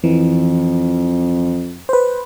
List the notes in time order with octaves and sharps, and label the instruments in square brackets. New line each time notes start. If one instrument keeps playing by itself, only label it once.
[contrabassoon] F2 [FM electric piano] E3
[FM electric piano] B4 C5